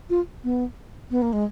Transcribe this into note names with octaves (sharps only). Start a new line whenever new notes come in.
F4
B3
B3
A#3
G#3